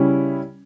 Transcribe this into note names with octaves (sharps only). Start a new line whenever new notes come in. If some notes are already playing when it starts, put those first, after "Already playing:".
Already playing: C#3 G3 C#4 E4